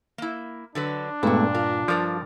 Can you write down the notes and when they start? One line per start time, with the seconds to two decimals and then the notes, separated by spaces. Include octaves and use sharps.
0.18 A#3 E4
0.75 D3 F#3 D4 B4
1.23 G2 A#2 G#3 A3 B3 E4 F#4
1.55 F4 A#4
1.88 G2 F3 A#4 D5